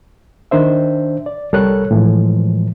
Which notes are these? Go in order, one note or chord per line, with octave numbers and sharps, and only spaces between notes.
D#3 D4 C5 E5
D5
C2 G3 A4 A#4 C#5 F#6
A2 E3 F3 G#3